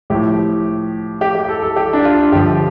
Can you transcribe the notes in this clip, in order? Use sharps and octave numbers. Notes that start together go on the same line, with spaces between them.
A2 F3 G4
G4
G4
A4
A4
G4
D4
F4
G2 D3 F3 G4